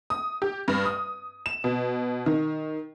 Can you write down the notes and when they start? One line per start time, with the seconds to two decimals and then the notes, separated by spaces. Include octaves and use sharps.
0.10 D#6
0.42 G4
0.68 G2
0.85 D#6
1.46 E7
1.64 B2
2.26 D#3